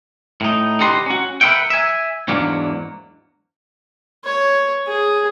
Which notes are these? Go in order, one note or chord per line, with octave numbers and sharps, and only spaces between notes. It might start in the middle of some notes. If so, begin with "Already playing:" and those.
A2 D#4
D3 D#4 G4 B4 A#5 C6
C#4 F#4
A#4 B4 D5 E5 F#5 G5
E5 G#5
E2 G#2 F#3 A#3 D4
C#5
G#4